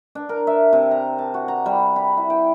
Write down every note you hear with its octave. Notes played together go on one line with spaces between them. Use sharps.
D4
A#4
E5
C3
A#5
A5
F#4
A#5
G3
B5
E4
G5